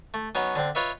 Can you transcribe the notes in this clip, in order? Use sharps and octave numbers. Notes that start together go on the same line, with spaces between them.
A3
F#3 B3 C#4 D#4
D3 C4
F4 B4 C#5 D#5 E5